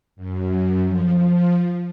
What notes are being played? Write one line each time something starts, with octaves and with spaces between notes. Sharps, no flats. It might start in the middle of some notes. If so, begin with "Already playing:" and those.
F#2
F3